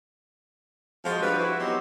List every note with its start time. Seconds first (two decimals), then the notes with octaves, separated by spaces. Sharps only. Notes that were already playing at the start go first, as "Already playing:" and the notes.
1.05 F3 G#3 F#4
1.22 F3 G3 D4 F#4 B4
1.39 E4 F#4
1.59 F#3 B3 C4 D#4 F#4 G4